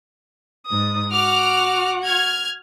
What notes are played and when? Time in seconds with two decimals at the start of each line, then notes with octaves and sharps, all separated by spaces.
0.67 G#2 D#6
1.12 F#4 F#5 D6 F6
2.05 F6 G#6